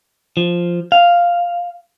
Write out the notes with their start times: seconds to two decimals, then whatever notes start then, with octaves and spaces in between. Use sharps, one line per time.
0.37 F3
0.92 F5